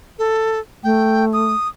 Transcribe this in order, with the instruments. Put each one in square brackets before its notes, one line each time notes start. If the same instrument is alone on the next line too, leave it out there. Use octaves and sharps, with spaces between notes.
[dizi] A4
[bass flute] A3 [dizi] G5
[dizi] D#6